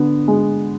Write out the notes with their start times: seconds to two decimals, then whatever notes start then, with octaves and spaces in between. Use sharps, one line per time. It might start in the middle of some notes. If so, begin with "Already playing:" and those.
Already playing: D3 B3
0.28 G#3